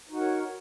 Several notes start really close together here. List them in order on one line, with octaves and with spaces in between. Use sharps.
D#4 F#4 F#5 A#4 C#5